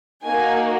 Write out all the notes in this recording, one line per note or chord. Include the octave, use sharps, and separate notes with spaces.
A#3 D#4 F#4 G#5